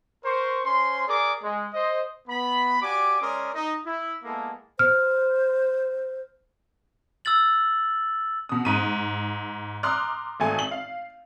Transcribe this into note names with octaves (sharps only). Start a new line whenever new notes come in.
A#4 C5 C6 C#6
C#4 C5 C6
G#4 A#4 D5 D6
G#3
C5 D#5
B3 B5
F#4 G4 D5 G#5 D6
G#3 C#4 A#4 D5 C6 D#6
D#4 D#5
E4
G#3 A#3 B3 E4 A4
C5 F6
E6 F6 A6 F#7
B2 D#6
G#2 D#7
A#5 C6 D6 D#6 F6 F#6
G#1 A3 G#5
F#7
F5